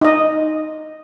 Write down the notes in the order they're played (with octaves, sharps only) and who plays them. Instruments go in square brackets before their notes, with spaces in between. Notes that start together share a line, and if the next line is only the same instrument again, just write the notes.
[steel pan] D#4 D#5